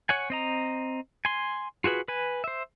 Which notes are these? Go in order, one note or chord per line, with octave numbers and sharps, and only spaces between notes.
C#5 F#5 G#5
C4 D#5 A#5
G#5 C6
F4 F#4 G#4 B4
B4 G#5
C5 E5